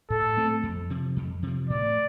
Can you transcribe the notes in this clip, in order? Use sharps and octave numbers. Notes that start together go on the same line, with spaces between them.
A2 A4
A3 C4
F2
C3 F3
F2
C3 F3
A2 D5